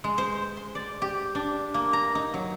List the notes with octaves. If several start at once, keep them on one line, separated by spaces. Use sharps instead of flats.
G#3
C5
C6
D5
G4
D4
A#3
A#5
D#4
F#3